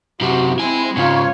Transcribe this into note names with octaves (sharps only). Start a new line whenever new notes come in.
F#2 C3 F#4
G#3 C4 E4 G#5
G#2 C#3 F4 C#5